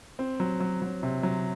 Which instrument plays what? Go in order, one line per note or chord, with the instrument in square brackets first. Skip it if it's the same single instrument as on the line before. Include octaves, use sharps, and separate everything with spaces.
[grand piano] C4
F#3
F#3
F#3
C3
F#3